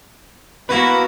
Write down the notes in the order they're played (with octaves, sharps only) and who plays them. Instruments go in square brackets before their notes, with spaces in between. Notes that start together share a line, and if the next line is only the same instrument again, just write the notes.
[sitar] A#3 E4 B4 [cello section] B3 F#4